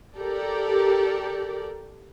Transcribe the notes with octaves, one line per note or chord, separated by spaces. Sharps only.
G4 A4 A#4 D5